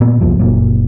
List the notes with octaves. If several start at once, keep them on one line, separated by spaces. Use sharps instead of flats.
A#2 B3
C2 F2 A#2 F3
F#1 A#2 F#3